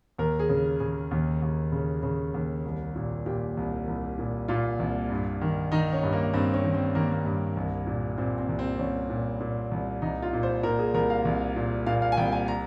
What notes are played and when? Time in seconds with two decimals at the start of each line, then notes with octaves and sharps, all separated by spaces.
0.18 D#2 A#4
0.39 G#4
0.49 C#3
0.80 C#3 G#4
1.11 D#2
1.42 D#2
1.72 C#3
2.03 C#3
2.34 D#2
2.65 C2
2.95 A#2
3.26 A#2 G4
3.57 C2
3.87 C2
4.19 A#2
4.48 A#2 F4
4.79 C2
5.10 G2
5.41 D#3
5.72 D#3 D#4
5.93 C#4
6.03 G2
6.13 A#3
6.33 G2 C4
6.54 C#4
6.64 D#3
6.74 C4
6.94 D#3 A#3
7.12 A#3
7.25 G2
7.57 C2
7.87 A#2
8.18 A#2 C4
8.38 C4
8.49 C2
8.59 C4
8.79 C2 C#4
9.10 A#2
9.40 A#2
9.71 C2
10.02 C2 D#4
10.22 F4
10.33 A#2
10.43 C5
10.63 A#2 A#4
10.79 G#4
10.94 C2 A#4
11.10 F5
11.25 C2
11.56 A#2
11.86 A#2 F5
12.02 F5
12.12 G#5
12.17 C2 G5
12.32 G#5
12.48 A#5